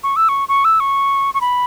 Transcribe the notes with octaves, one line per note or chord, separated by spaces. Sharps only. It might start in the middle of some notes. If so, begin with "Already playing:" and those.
C#6
E6
C#6
C#6
E6
C#6
C#6
B5